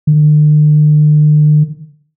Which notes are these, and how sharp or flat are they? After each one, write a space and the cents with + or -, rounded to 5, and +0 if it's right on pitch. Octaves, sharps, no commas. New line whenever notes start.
D3 +45